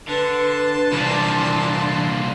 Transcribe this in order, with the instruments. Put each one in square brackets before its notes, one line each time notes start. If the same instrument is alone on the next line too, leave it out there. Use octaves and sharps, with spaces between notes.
[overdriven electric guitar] D3 [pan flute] B4 [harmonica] A5 C6
[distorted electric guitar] C2 A#2 [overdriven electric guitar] E3 D5 [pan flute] D4